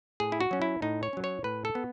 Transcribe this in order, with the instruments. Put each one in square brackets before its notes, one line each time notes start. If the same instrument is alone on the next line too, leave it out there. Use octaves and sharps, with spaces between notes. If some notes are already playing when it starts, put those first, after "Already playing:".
[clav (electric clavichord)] A2 G#4
E4
F#4
F#3 C#4
E4
A2 D#4
C#5
F#3 C#4
C#5
A2 B4
A4
B3